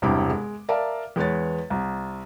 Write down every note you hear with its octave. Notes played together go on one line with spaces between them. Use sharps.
E1 G2 C3 E4 G4 D6
G#3
A#4 D5 E5 F5 A5 A#5
E2 G#3 B4 C#5 A6
C2